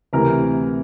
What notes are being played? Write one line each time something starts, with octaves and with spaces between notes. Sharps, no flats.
D2 C3 E3 A#4